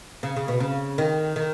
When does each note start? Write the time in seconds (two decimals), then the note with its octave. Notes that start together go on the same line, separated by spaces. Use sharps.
0.23 C#3
0.36 C#3
0.48 B2
0.60 C#3
0.98 D#3
1.36 D#3